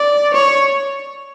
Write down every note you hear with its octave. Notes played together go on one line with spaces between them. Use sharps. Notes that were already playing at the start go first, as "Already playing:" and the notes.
Already playing: D5
C#5